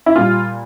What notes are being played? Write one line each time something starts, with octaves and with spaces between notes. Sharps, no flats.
E4
A#2 G3 F4